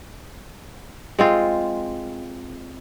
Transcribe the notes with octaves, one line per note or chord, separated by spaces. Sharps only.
G#3 C4 F4